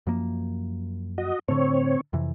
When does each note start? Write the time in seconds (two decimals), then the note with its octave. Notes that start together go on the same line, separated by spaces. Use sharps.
0.07 F#2 F3 A#3
1.18 F#4 D#5
1.48 A2 D3 C4 C#5
2.13 F2 C3 E3